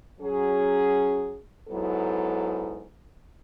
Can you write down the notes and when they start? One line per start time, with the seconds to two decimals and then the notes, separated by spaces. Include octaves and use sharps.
0.19 F#3 C#4 G#4
1.66 G#2 F#3 B3 E4 A4